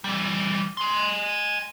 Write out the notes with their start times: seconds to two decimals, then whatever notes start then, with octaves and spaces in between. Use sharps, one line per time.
0.04 E3 G3
0.77 G#5 C6